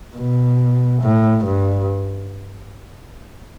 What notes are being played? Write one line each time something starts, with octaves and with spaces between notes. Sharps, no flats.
B2
A2
G2